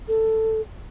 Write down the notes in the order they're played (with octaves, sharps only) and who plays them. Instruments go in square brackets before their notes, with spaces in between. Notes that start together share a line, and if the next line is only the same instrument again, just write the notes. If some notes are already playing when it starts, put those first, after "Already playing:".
[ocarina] A4